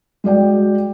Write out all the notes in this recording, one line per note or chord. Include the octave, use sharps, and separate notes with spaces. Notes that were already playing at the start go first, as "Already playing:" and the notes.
G#3 F#4 D5 G5